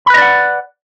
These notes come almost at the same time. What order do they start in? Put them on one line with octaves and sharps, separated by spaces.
B5 B4 D#5 D5 F#5